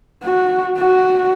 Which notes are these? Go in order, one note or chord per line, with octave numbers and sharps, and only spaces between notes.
F#4
F#4